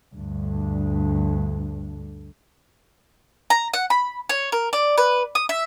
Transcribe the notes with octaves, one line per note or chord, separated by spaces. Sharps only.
D2 G2
A#5
F#5
B5
C#5
A#4
D5
B4
D#6
E5